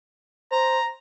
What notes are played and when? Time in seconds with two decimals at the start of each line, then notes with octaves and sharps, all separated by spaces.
0.52 C5 A#5